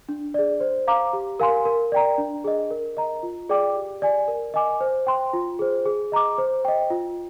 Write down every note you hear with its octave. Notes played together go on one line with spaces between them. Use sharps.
D4
G#4 D5
C5
F5 A#5 D6
G4
A#4 F5 G#5 C6
A#4
D5 G5 A#5
D4
G#4 D#5
A#4
D#5 A#5
F4
G#4 D5 G5 D6
G4
D5 G#5
A#4
D#5 G#5 D6
C5
G5 C6
F4
G#4 C5
G#4
D#5 A#5 D6
C5
D#5 G5
F4